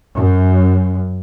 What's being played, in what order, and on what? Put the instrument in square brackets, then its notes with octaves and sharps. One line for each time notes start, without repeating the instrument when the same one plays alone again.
[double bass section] F#2